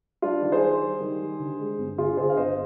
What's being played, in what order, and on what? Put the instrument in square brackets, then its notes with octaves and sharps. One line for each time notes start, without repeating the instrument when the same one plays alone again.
[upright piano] G3 D4 F4
D#3
G#4 C5
G3
G3
D#3
G3
D3
G#3
G1
D3 F4 G#4
D3 G#4 C5
F5
G1 C5 D#5